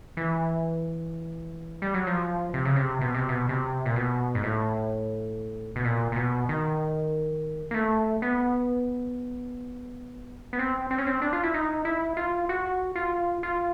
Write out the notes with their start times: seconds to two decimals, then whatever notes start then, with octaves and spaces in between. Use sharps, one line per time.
0.17 E3
1.82 G3
1.94 F#3
2.07 F3
2.54 C3
2.65 C#3
2.76 C3
3.01 B2
3.14 C3
3.29 B2
3.49 C3
3.86 A#2
3.96 B2
4.35 G#2
4.43 A2
5.76 B2
5.85 A#2
6.12 A#2
6.16 B2
6.49 D#3
7.71 A#3
7.74 A3
8.22 B3
10.53 B3
10.59 C4
10.91 C4
10.98 C#4
11.07 C4
11.22 D4
11.33 F4
11.43 E4
11.54 D#4
11.85 E4
12.17 F4
12.49 F#4
12.96 F4
13.43 F4